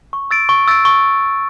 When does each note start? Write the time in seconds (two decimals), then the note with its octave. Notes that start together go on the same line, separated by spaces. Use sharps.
0.13 C#6
0.31 E6 A6 D7
0.49 C#6
0.68 E6 A6 D7
0.85 C#6